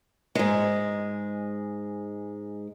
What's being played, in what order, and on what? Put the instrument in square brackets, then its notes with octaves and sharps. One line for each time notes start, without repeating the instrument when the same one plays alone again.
[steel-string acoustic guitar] G#2 G#3